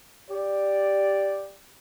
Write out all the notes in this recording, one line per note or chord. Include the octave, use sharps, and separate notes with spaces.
G4 D5